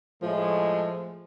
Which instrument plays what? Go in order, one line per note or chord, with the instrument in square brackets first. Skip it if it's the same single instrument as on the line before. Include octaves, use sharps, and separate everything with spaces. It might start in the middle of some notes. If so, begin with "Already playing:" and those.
[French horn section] A2 G#3 A3 [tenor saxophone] F3